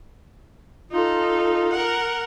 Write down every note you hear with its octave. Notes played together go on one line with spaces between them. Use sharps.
D#4 F4 A4
A#4 F#5